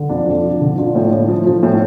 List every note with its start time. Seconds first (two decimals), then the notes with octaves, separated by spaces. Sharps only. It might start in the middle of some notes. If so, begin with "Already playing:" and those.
Already playing: D3
0.10 F2 D4 F4
0.26 F3
0.44 F3
0.61 D3
0.78 F3 D4 F4
0.95 A2
1.12 A2
1.28 F3
1.47 F3
1.63 A2